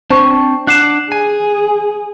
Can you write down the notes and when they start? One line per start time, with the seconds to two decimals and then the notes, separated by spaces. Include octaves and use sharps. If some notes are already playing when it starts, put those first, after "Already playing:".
0.10 C4 D4 C5 A5 C#6
0.67 D4 F#5 D6 F#6 C7 E7
1.12 G#4 G#5